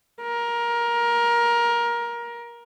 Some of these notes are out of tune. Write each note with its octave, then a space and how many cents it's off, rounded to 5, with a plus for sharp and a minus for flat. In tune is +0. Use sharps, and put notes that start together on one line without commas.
A#4 +20